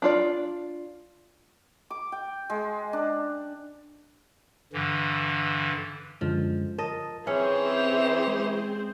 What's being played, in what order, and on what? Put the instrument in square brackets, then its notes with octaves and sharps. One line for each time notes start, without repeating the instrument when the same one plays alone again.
[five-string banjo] D4 F4 D5
[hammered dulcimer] D6
G5
G#3
D4
[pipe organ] G2 D3 E3
[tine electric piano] F#2 D3 G#3 [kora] F3
[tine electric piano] A#4 A5 [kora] D#5
[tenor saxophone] E3 [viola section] C4 G#4 C5 [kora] C#4 [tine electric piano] E5 C#7
[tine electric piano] G#3